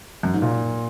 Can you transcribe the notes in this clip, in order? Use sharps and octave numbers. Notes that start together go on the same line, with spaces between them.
F#2
G#2
A#2